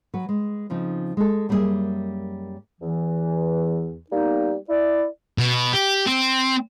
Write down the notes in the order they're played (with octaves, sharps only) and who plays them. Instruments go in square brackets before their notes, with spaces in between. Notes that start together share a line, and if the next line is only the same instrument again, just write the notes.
[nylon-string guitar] F#3 F#4 B4
G#3
C#3 F3 C4 D#4
G#3 A4
F#2 G3 A#3 C#4 G#4 E5
[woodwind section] E2 E3
G3 A#3 B3 D#4
E4 D5
[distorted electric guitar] B2
G4
C4